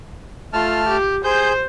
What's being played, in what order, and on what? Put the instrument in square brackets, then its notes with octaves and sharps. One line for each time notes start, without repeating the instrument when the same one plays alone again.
[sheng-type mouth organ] A3 A5 F6 [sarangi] F4
[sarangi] G4
[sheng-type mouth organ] G#4 G6 [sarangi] C5